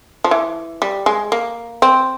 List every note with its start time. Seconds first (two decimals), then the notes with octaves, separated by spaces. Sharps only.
0.24 F3
0.31 E3
0.82 G3
1.06 G#3
1.32 A#3
1.82 C4